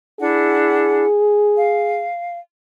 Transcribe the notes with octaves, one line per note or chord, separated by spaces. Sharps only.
D4 E4 G#4 F#5
F5